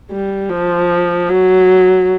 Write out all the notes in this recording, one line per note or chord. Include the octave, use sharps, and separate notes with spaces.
G3
F3
F#3